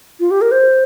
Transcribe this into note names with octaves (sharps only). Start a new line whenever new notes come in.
F4
G4
A#4
C5